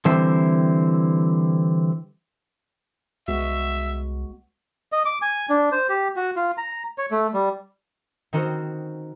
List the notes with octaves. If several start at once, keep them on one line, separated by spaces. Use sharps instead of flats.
D3 E3 G3 C4 E4 C5
C2 G#3 B3 F#4 E5
D#5
D6
G#5
D4
C5
G4
F#4
F4
A#5
C#5
A3
G3
D#3 C4 C#4 D#4 F#4 C5